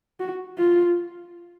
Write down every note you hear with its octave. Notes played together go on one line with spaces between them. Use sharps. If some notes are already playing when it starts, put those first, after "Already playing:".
F#4
F4